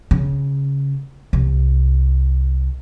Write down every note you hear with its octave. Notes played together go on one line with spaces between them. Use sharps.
C#3
C2